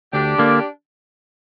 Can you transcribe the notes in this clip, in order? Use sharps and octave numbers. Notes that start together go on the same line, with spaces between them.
D2 D4 G4
D3 A#3